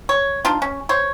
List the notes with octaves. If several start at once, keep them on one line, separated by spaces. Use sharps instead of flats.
C#5
D4 D#4 F4
C#4
C5 C#5